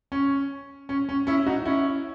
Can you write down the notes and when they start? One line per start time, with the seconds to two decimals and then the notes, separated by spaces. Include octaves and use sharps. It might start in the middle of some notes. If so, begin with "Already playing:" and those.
0.12 C#4
0.89 C#4
1.09 C#4
1.27 C#4 E4
1.46 D#4 F#4
1.65 C#4 E4